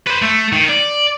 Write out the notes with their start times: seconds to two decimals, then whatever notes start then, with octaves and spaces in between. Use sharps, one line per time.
0.07 B4 C5
0.22 A3
0.52 D#3
0.69 D5